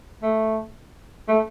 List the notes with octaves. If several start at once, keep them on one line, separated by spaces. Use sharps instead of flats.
A3
A3